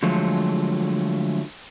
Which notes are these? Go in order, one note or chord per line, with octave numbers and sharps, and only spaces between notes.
D3 F3 F#3 G#3 A3